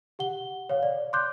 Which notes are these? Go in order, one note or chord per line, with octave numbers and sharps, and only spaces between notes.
G4 F#5 G7
C#5 F5
D5
C6 D6 F#6 G6